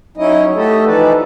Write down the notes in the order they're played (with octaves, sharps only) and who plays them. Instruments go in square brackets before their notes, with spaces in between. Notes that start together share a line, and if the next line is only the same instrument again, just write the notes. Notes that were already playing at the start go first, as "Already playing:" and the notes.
[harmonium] F#3 C#4 D#4 E4 D#5
A3 F#4 G4 A4 D#5
E3 F3 D#4 A4 B4 D5